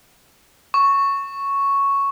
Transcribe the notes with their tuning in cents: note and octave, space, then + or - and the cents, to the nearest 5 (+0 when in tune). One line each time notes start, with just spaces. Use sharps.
C#6 +0